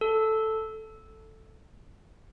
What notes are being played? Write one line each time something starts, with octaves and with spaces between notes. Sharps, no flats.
A4